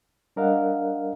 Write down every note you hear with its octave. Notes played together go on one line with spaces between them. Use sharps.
G3 D4 A#4 D#5 F5 F#5